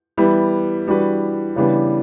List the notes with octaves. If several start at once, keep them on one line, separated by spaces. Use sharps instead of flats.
E3 G3 B3 E4 B4
E3 G3 D4 F#4 B4
C#3 E3 G3 B3 D4